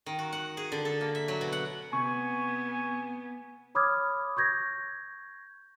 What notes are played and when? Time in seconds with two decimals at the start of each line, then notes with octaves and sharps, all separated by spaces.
0.06 D#3
0.19 F#4
0.32 F#5
0.57 G#4
0.72 D3
0.85 A4
1.01 A#3
1.15 E5
1.28 F#3
1.41 B2
1.52 F#5
1.93 C3 B3 G#5 C#6
3.75 C#5 B5 D6 D#6 F6 G#6
4.37 C#6 G6 G#6 A#6